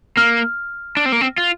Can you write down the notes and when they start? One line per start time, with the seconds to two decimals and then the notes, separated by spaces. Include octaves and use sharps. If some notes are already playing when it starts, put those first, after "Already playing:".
0.17 A#3 F6
0.97 D4
1.05 C4
1.12 A#3
1.21 C4
1.38 F4